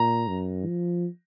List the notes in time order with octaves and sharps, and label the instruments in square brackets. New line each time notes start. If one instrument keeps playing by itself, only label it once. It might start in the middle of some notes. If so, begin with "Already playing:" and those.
Already playing: [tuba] A#2 [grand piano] A#5
[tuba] F#2
F3